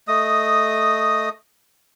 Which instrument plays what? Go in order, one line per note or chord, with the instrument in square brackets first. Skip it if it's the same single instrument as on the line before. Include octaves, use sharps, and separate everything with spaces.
[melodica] A3 D#5 D#6